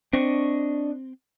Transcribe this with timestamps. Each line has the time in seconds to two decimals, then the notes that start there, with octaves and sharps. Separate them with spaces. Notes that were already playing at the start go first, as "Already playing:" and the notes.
0.13 C4 D4 D#5 C#6